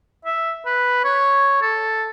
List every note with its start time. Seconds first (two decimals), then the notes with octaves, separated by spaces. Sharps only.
0.25 E5
0.65 B4
1.04 C#5
1.61 A4